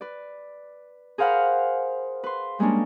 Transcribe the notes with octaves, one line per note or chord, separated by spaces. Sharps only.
B4 D5
G#4 A#4 C5 F5 F#5 B5
B4 C6
G3 G#3 A#3 C#4 D4